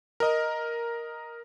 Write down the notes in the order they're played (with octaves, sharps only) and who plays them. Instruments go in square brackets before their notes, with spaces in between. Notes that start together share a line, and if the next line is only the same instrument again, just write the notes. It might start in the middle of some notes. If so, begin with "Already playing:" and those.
[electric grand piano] A#4 D#5